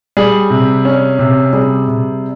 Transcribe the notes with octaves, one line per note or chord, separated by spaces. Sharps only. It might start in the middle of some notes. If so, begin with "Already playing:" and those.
G3 G#4
C3
C#4
C3
G3 G#4
C3